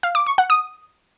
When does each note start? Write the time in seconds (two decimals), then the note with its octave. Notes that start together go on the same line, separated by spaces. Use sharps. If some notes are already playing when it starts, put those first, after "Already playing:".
0.03 F5
0.15 D6
0.26 C#6
0.38 F#5
0.50 D#6